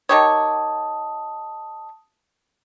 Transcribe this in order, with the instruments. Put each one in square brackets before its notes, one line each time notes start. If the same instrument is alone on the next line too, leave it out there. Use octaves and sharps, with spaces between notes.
[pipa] D#3 G4 C#5 [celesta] A5 D#6